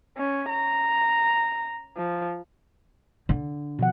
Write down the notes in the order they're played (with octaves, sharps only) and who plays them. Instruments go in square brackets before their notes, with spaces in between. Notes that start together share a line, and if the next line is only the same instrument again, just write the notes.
[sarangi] C#4
A#5
F3
[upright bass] D3
[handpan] B2 F3 F#5